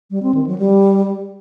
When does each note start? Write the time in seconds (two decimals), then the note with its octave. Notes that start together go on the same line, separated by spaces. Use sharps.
0.11 G3
0.23 C4
0.34 D#3
0.46 F#3
0.58 G3